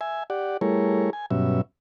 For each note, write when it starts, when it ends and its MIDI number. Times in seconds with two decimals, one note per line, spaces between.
0.01 0.23 76
0.01 0.23 80
0.30 0.57 67
0.30 0.57 74
0.30 0.57 78
0.61 1.10 55
0.61 1.10 57
0.61 1.10 64
0.61 1.10 68
0.61 1.10 70
0.61 1.10 73
1.13 1.26 80
1.31 1.61 43
1.31 1.61 47
1.31 1.61 54
1.31 1.61 61
1.31 1.61 76